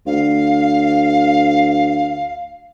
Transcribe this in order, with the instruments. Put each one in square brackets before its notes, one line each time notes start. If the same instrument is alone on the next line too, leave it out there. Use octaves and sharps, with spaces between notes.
[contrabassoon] D2 [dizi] F5